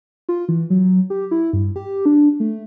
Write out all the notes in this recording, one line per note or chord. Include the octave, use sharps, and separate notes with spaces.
F4
E3
F#3
G4
E4
G2
G4
D4
A3